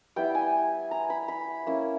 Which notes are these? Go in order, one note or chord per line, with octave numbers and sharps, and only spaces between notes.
G3 B3 E4 G5
G#5
A#5
B5
B5
A#3 C#4 E4